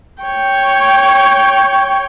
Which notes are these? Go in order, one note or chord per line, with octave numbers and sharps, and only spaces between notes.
C#5 G5